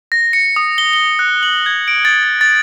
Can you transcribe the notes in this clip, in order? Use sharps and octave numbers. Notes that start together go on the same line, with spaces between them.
A#6
C#7
D#6
G7
G7
F#6
F#7
G#6
D7
A6
A6
A6